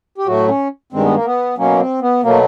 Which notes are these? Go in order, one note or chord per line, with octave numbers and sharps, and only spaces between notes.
G4
A2 F#3 A3 F#4
C#4
G2 D#3 G#3 C4
B3
A#3
B3
B2 F#3 A#3 C#4
C4
B3
B2 F#3 A3 A#3